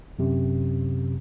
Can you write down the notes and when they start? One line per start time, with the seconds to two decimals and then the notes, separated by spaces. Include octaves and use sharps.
0.19 F#2 C3